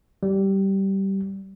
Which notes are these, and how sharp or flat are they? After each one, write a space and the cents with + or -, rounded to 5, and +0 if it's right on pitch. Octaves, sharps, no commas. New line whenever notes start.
G3 -15